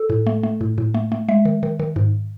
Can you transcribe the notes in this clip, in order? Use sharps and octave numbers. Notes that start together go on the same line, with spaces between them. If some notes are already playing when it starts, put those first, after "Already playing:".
Already playing: A4
A2
A3
A3
A2
A2
A3
A3
G#3 E5
D#3
D#3
D#3
G#2